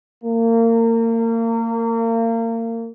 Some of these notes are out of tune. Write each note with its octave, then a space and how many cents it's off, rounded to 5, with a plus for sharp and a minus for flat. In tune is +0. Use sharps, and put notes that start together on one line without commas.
A#3 -30